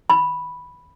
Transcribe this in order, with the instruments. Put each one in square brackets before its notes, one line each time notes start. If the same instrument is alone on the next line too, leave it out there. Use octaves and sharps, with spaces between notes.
[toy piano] B5